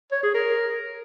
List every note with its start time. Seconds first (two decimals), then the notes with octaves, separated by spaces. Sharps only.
0.12 C#5
0.23 G#4
0.34 A#4